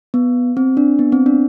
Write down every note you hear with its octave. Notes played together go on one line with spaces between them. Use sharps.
B3
C4
D4
B3
C4
D4